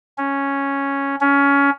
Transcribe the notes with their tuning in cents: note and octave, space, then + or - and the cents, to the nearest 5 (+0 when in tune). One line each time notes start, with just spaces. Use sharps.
C#4 +0
C#4 +20